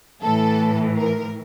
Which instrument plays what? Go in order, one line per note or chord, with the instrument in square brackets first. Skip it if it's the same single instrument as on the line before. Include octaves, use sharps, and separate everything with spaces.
[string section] A2 E3 A4
A#4